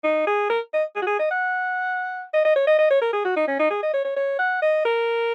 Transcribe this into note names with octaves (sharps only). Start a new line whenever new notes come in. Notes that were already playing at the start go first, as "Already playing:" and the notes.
D#4
G#4
A#4
D#5
G#4
F#4
G#4
D#5
F#5
D#5
D#5
C#5
D#5
D#5
C#5
A#4
G#4
F#4
D#4
C#4
D#4
G#4
D#5
C#5
C#5
C#5
F#5
D#5
A#4